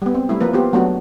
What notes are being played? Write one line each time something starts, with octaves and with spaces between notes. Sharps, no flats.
G3 B3
C4
G3 A3 E4
F3 A#3 B4
B3 F4 G4
F#3 A3 B3 D4 F#4